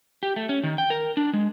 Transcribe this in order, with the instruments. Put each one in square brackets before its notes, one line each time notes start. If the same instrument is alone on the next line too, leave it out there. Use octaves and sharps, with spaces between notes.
[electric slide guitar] G4
A3
C#4
D#3
G5
A#4
D4
G#3